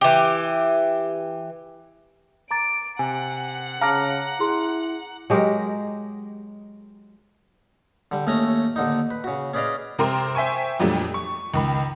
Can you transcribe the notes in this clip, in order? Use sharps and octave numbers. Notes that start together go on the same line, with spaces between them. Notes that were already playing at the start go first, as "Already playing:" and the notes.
E3 G4
A#5 D6 A6 D7
C3 F#5 G#5
C#3 F5 A5 A#5 D6 F6 A#6
E4 G#4 C6
F#3 G#3 G4 A#4
D3 G3
D#2 A3 C#4 A#5 D#6
D#2 D3 D#4
B4
C#3 F#4
C#4 G#4 B4 D5 D#5 F5
C3 C4 A#4 C6
C5 E5 G5 G#5 C#6
F2 A#2 F#3 G3 A3 D4
C#6
C#2 D#3 B5